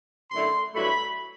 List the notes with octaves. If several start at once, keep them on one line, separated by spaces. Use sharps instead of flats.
F#2 D3 A3 E4 C6
G2 F#3 A3 E4 B5